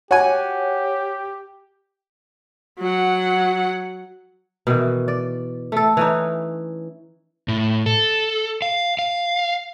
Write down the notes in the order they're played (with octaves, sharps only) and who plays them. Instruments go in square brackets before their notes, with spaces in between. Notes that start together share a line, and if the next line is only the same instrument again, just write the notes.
[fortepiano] F#4 G#5 [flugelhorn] G4 [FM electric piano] C#5
[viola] F#3 F#5
[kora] B2 D#3 E3
D5
A3 A4
E3 C#4 D#4
[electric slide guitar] A2
A4
F5
F5